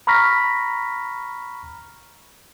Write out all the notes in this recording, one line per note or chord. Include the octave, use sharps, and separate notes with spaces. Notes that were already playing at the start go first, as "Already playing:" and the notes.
A#5 B5 C#6 F6 A#6 B6